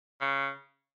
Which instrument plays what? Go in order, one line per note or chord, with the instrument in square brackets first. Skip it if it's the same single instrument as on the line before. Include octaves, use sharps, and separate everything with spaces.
[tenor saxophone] C#3